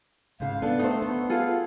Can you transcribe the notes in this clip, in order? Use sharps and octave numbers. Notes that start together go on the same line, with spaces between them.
G#2 C#3 F5
B3 D4 A4
A3 D#4 C5
B3
F4 G#4 A4 F5